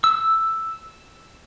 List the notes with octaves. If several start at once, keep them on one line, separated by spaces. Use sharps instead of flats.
E6